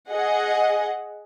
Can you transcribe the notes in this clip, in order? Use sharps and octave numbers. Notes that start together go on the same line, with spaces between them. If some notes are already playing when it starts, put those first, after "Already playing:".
G#4 D#5 F#5